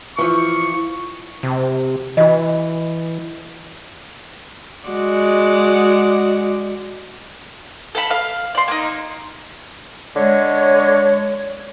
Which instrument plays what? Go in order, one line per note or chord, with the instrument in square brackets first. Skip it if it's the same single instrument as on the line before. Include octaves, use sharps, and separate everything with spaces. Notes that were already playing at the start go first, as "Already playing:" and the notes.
[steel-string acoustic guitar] E3 F3 [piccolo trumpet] C#6
[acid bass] C3
[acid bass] E3 [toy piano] F#4 D#5
[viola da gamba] G#3 F#4 D5
[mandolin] A4 F5 B5
F5
D5 C6
A#3 D#4
[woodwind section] D3 G#3 C#5